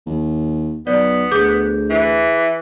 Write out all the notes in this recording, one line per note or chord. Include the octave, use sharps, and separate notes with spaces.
D#2
B1 B3 D5
D2 G#4 D6 G6
E3